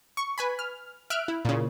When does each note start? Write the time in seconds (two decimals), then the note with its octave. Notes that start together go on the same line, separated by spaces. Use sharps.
0.17 C#6
0.38 B4 G#5 B5
0.59 F6
1.10 E5 F6 F#6 D7
1.28 E4
1.45 A#2 C#3